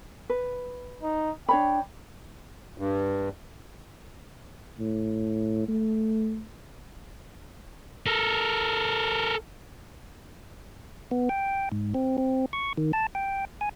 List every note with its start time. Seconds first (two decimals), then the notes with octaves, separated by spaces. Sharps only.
0.29 B4
1.03 D#4
1.48 D4 C#5 G5 B5
2.78 G2
4.80 A2
5.68 A3
8.06 A4 A#4
11.11 B3
11.29 G5
11.72 G#2
11.94 C4
12.18 C4
12.53 C#6
12.77 D#3
12.93 A5
13.15 G5
13.61 G#5